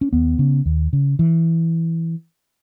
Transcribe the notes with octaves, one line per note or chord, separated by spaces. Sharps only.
C#4
D#2 B3
C#3
D#2
C#3
E3